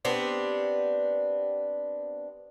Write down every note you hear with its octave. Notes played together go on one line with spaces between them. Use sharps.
B3 C4 D4 G4